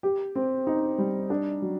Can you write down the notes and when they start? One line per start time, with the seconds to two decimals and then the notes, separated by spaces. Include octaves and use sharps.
0.03 G4
0.35 C4
0.67 D#4
0.98 G3
1.30 D4
1.62 F#3